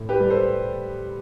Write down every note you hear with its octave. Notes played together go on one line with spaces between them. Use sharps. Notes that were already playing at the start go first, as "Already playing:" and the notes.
Already playing: A2
G4 B4
G3
A4 C5